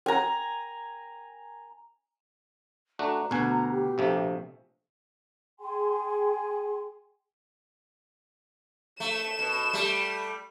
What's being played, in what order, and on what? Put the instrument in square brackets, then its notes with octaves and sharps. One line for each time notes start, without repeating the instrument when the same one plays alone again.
[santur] G#5 A#5
[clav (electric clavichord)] A3 D4 F#4 [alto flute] A#5
[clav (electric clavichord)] D2 G#5 [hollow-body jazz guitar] B2
[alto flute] G4
[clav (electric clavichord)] A#1 C3 A3
[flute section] G#4 G5 G#5 C6
[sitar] A3 [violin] E7
[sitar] B2
G3 A3